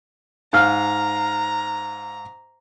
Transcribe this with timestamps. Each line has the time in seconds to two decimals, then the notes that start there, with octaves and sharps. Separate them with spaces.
0.53 G#2 F5 A#5 F6